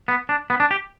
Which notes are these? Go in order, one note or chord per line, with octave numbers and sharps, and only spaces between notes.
B3
D4
B3
D4
G4